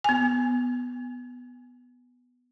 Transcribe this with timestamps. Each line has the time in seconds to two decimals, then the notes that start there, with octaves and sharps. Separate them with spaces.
0.04 B3 G#5